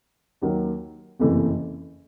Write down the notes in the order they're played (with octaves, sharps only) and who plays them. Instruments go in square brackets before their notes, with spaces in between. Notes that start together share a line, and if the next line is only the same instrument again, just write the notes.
[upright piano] D#2 D#3 F#3 A#3
F#1 F2 C3 E3 A3